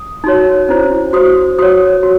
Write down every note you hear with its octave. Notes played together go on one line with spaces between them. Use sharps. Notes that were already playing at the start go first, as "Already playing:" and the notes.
Already playing: D#6
D#4 F#4 C#5
C#4 E4 C5
F#4 C5 D#6
F#4 C#5 D#6
F#4